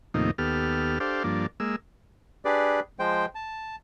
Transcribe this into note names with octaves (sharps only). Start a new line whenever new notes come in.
D#2 A2 C3 F3 A#3 D#4
D#2 B3 G4 A4 F6
D4 G4 A4 C5 F5
G2 F3 A#3 D4
G#3 A#3 E6
D4 G4 G#4 B4 D5
F3 G#3 C5 G5
A5